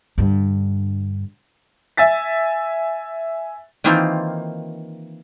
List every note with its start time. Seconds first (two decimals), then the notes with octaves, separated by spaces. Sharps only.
0.18 G2 D3
1.97 E5 G#5 A6 B6
3.84 D#3 E3 A#3 C4 D#4 F4